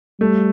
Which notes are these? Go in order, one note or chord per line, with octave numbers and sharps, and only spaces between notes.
G3 A3